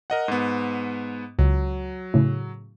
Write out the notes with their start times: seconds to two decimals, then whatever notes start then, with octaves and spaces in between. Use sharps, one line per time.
0.10 A#4 D#5 F#5
0.28 G#2 B3
1.39 C#2 F#3
2.14 A2 C#3